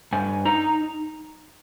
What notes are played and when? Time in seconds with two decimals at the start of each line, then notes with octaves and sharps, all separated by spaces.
0.12 G2 G#5
0.45 D#4 A#5